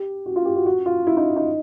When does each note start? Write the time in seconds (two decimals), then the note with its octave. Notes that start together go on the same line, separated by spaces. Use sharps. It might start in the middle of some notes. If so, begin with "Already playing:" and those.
Already playing: G4
0.26 F#4
0.36 F4
0.45 G4
0.56 F#4
0.66 F#4
0.86 F4
1.07 E4
1.17 D#4
1.36 D#4